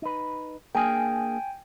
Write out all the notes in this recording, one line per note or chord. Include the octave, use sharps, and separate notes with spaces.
D#4 B4
A#3 D4 G#4 G5 G#5